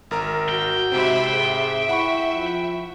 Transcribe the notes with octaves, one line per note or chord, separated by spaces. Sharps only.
G#1 A#4 A#5
F#4 G5
G#2 C3 C4 C5 E5 B5
G#4 E5
E4 F#5 B5 C#6
F3